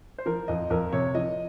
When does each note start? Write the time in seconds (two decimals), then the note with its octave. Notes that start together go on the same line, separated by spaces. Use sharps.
0.18 C5
0.26 F3 A#4
0.48 F2 D#5
0.70 F2 A#4
0.93 C3 C#5
1.15 F3 D#5